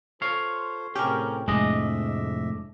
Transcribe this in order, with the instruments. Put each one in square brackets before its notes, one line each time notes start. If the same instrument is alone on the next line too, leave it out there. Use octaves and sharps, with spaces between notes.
[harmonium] F4 A4 C5 [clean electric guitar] C#5 F5
[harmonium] A2 C3 G#4 [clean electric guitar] C#4 A#4 [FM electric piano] G4
[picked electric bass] F1 A2 [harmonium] F2 E5 [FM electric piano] G#3 [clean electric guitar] D4 D#5